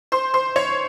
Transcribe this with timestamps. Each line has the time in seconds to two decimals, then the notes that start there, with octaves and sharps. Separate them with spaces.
0.12 C5 C6
0.34 C5 C6
0.56 C#5 C#6